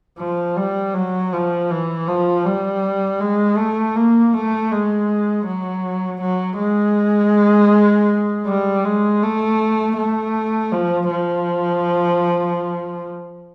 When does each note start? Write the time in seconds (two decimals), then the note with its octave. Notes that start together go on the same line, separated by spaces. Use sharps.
0.19 F3
0.57 G3
0.94 F#3
1.33 F3
1.70 E3
2.07 F3
2.45 G3
3.20 G#3
3.58 A3
3.96 A#3
4.33 A3
4.71 G#3
5.46 F#3
6.21 F#3
6.59 G#3
8.47 G3
8.85 G#3
9.23 A3
9.97 A3
10.72 F3
11.11 F3